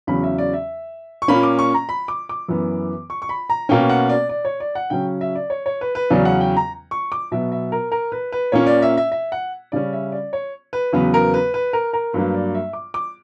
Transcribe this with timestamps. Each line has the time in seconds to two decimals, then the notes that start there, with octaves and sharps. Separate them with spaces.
0.07 E2 C#3 F#3 C#4 B5
0.23 E5
0.38 D5
0.53 E5
1.22 C#6
1.28 A#2 A#3 C#4 B5
1.43 D6
1.59 C#6
1.74 A#5
1.89 B5
2.08 D6
2.29 D6
2.48 F#2 E3 B3
3.10 C#6
3.22 C#6
3.29 B5
3.50 A#5
3.69 B2 A#3 C#4 G5
3.89 F#5
4.09 D5
4.29 D5
4.45 C#5
4.60 D5
4.75 F#5
4.90 C#3 F#3 C#4 G5
5.21 E5
5.35 D5
5.50 C#5
5.66 C#5
5.81 B4
5.95 B4
6.10 E2 C#3 F#3 C#4 D5
6.25 F#5
6.41 G5
6.57 A#5
6.91 C#6
7.12 D6
7.32 B2 F#3 B3 E5
7.52 E5
7.72 A#4
7.92 A#4
8.12 B4
8.32 B4
8.52 A#2 A#3 C#4 C#5
8.67 D5
8.82 E5
8.97 E5
9.12 E5
9.32 F#5
9.72 C#3 G3 C#4 D5
9.93 E5
10.12 D5
10.33 C#5
10.73 B4
10.92 E2 C#3 F#3 B3 B4
11.14 A#4
11.34 B4
11.54 B4
11.73 A#4
11.93 A#4
12.13 G2 F#3 A#3 B4
12.34 D5
12.54 E5
12.73 D6
12.94 D6